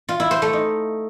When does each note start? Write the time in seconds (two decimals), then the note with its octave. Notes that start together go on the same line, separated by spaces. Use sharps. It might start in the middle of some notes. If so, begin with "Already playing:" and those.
0.09 F4
0.20 E4
0.31 C5
0.42 A3
0.53 D#4